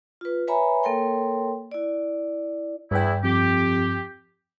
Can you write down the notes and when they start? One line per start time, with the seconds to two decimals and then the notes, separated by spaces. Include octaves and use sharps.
0.21 F4 B4
0.48 B4 C#5 E5 G#5 A#5 B5
0.83 A#3 A4 A#4 C#5 G5 C6
1.72 E4 D5
2.91 E2 G2 E4 G5
3.23 F2 G4